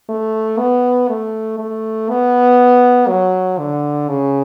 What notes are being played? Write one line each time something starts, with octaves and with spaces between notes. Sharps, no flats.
A3
B3
A3
A3
B3
F#3
D3
C#3